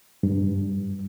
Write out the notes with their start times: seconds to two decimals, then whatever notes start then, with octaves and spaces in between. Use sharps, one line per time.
0.23 G2